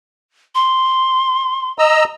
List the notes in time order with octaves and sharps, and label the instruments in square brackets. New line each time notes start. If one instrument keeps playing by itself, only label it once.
[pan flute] C6
[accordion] D#5 A#5 E6